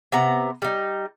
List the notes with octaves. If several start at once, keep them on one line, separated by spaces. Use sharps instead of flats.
C3 B3 A#5
G3 D#4